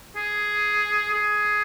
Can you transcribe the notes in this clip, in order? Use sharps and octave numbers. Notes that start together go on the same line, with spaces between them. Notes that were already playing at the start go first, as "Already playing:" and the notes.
G#4
G#4